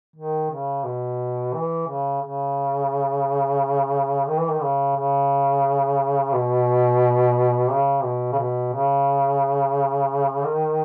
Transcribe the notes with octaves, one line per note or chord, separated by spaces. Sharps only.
D#3
C#3
B2
E3
C#3
C#3
D#3
E3
D#3
C#3
C#3
B2
C#3
B2
C#3
B2
C#3
D#3